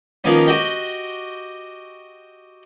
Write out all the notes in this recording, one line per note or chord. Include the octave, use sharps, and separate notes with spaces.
D#3 F3 A#3 B3 C#4
F#4 G4 D#5 G5